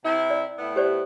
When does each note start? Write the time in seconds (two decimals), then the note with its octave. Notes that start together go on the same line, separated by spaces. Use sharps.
0.05 C3 E4
0.30 D5
0.58 A2 B3 E4
0.76 G4 C5 D5